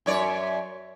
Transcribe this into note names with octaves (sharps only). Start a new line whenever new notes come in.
F#2 C#5 D5